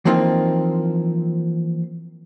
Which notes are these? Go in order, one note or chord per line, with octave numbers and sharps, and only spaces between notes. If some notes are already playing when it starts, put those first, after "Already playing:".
E3 F3 A#3 C4 D#4 F4